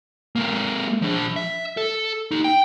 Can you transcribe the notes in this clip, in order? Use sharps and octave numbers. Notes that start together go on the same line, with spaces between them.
G#3 A#3
F3 D4
E5
A4
D#4 G4
G5